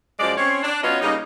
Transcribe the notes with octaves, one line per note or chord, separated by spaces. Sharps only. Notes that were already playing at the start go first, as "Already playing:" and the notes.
F#2 F3 G#3 D5
C4 C#4 C5 C#5
D4
F#3 B3 C#4 F4 C#5 D#5
C#3 G3 A#3 D#4